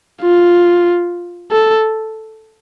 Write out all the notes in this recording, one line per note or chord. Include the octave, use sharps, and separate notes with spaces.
F4
A4